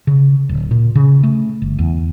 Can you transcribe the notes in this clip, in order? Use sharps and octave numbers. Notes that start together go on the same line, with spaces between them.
C#3
D1
A#2
C#3
A3
G1
E2